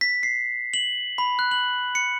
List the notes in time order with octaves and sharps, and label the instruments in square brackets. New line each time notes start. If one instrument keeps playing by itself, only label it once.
[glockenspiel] B6
C7
F#7
B5
F#6
F#7
C#7